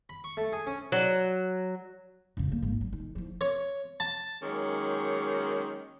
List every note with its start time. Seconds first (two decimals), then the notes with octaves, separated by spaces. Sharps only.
0.09 B5
0.24 C#6
0.37 A3
0.53 G#4
0.67 C#4
0.92 F#3
2.37 F2 C#3
2.49 G3 A#3
2.62 G#1 D2
2.81 F#3
2.93 D#3
3.15 E2 F3
3.41 C#5
4.00 A5
4.43 D#3 F#3 G#3 A#3 C#4